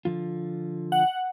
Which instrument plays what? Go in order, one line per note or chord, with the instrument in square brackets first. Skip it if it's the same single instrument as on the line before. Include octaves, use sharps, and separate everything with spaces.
[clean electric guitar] D3 F3 F4
[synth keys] F#5